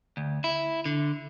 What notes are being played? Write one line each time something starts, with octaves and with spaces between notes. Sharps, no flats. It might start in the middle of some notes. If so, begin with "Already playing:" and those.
D2
E4
D3